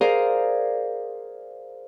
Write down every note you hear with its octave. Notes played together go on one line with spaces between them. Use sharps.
G#4 A#4 C5 D5 F5